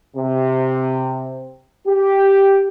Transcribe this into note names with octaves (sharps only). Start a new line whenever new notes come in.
C3
G4